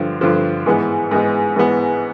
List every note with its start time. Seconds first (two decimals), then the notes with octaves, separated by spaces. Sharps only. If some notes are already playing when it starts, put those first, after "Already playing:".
Already playing: G2 D3 F3
0.21 G2 D3 F3
0.66 G#2 E3 G#3 B3
1.11 G#2 E3 G#3 B3
1.56 G#2 E3 G#3 B3